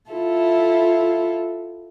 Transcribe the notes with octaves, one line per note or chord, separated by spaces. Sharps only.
E4 F4 A4